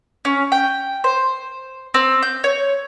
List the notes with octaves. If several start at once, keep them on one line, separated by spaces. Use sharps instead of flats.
C#4
G5
C5
C4
G6
C#5